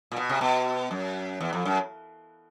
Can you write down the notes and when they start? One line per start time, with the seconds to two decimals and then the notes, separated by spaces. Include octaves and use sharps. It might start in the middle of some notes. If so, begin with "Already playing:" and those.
0.12 A#2
0.16 B2
0.29 C3
0.41 B2
0.91 F#2
1.41 E2
1.53 F2
1.65 F#2